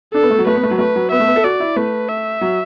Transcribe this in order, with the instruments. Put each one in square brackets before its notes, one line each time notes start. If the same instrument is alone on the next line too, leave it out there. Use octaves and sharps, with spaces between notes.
[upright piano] D4 [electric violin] A4
[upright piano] B3
A3
F#3
[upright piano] A3 [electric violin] B4
[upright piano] B3
A3
F#3
[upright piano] A3 [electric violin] B4
[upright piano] F#3
[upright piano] B3 [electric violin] E5
[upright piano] A3
B3
A4
[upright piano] F#4 [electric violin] D5
[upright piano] E4
[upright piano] A3 [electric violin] B4
[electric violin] E5
[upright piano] F#3